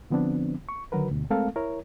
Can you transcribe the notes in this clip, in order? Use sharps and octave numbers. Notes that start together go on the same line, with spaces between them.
D3 F3 B3 C4 D4
C#6
D3 D#3 F#3 F#4 A#4 B4
D2 B2
G#3 A3 C4 A4 A#4 F5
E4 A#4 C#5